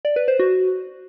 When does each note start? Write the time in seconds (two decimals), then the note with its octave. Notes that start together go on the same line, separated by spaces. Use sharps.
0.05 D5
0.16 B4
0.28 C5
0.39 F#4